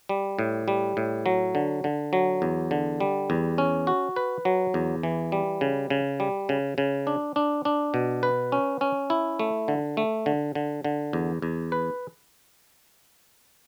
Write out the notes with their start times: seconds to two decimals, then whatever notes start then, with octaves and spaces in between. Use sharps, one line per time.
0.09 G3
0.39 A2
0.68 G3
0.97 A2
1.26 F#3
1.55 D3
1.84 D3
2.13 F#3
2.42 E2
2.71 D3
3.00 G3
3.30 E2
3.58 C#4
3.87 F#4
4.16 B4
4.45 F#3
4.74 E2
5.03 E3
5.32 G3
5.61 C#3
5.90 C#3
6.20 G3
6.49 C#3
6.78 C#3
7.07 D4
7.36 D4
7.65 D4
7.94 B2
8.23 B4
8.52 C#4
8.81 C#4
9.10 E4
9.40 A3
9.68 D3
9.97 A3
10.26 D3
10.55 D3
10.84 D3
11.13 E2
11.42 E2
11.72 B4